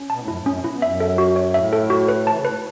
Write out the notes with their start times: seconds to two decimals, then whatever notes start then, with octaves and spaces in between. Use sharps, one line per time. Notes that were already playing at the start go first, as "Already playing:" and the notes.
Already playing: C#4
0.10 B2 A5
0.18 A2
0.27 F#2 E4
0.37 A2
0.46 F#2 C#4
0.58 B2
0.64 E4
0.70 B2
0.82 F#2 E5
1.00 A4
1.18 F#4
1.36 C#5
1.54 A2 E5
1.73 A4
1.90 F#4
2.09 B4
2.27 E3 A5
2.36 C#3
2.45 A2 B4